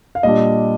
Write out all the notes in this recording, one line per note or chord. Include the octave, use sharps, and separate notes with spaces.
F5
A#2 G3 D4 D#5